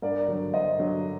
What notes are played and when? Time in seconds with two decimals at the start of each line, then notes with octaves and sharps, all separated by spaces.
0.02 G2 A#4 D5
0.28 D3 F#3
0.53 G2 C5 D#5
0.79 D3 F#3